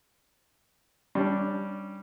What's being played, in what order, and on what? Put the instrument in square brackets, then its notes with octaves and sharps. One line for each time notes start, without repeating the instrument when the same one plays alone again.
[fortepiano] G3 C#4 D4